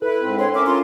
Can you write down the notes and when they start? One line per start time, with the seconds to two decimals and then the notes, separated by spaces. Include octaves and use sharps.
0.02 E4 A4 B4
0.21 G#2 C4
0.39 D4 C#5 C6
0.55 C#4 A#4 E5 D6
0.66 F4 C6